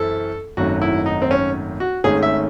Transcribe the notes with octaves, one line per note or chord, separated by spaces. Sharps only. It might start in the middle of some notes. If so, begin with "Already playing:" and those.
Already playing: F#2 E3 C4 E4 A4
G#1 F#2 D#3 F#3 A3 F#4
E4
D#4
C4
C#4
F#4
G#1 G#2 D#3 A3 C#4 G#4
E5